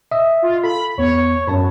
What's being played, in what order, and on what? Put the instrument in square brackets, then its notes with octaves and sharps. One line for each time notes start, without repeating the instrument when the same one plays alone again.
[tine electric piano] D#5 E5 D#6
[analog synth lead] F4
[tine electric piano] A4 [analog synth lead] B5
[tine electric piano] E2 B3 [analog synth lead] C#5
[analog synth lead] F#2 [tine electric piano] C#5 A5 B5